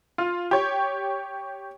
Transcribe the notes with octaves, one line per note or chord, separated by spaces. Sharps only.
F4
G4 C#5